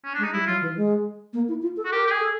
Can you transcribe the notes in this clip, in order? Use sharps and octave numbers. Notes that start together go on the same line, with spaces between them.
C#4
D4
G#3
D#4
G3 E4
F#3 F4
E3
G#3
A#3
E4
F4
A4
F#4
G4 A#4
G4
G#4
A4